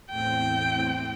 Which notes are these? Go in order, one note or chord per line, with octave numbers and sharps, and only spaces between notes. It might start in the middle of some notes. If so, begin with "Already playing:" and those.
E2 A2 C4 G5